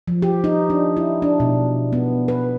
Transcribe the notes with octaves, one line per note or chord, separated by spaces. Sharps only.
F3
G4
D#4
D4
E4
D4
B2
B3
B4